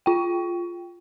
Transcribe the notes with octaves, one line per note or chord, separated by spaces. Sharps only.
F4 G5